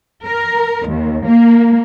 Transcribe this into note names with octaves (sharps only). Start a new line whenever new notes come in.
A#4
D#2
A#3